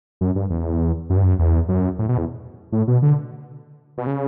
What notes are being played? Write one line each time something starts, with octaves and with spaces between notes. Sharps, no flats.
F#2
G2
E2
F#2
G2
F#2
E2
F#2
A2
B2
E2
A2
B2
D3
B2
C#3